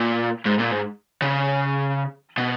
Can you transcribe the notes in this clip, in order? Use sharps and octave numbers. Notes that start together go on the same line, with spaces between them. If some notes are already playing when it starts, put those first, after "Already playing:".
Already playing: A#2
G#2
A#2
G#2
C#3
B2